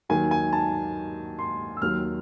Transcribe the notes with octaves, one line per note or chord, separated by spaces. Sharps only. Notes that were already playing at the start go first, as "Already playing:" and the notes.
D#2 D#3 F#3 G#5
G#5
A5
C6
E6
D#2 D#3 F#3 F6